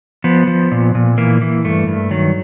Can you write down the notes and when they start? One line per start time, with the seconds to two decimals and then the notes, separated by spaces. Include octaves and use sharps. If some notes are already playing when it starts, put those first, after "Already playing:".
0.24 F3 B3
0.47 F3
0.72 A#2
0.95 A#2
1.18 E3 A#3
1.41 E3
1.65 G2 A3
1.87 G2
2.11 D#3 F#3